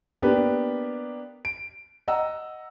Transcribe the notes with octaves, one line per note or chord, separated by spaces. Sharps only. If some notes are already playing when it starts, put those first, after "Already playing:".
A#3 B3 D4 G4 B4
D7
D#5 F#5 A#5 E6